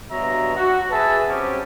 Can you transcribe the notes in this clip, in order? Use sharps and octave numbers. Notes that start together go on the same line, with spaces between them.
G2 B2 F#3 G#3 E5 A#5
F#4
G#4 B4 E5 A5
F#3 C4 C#4 G4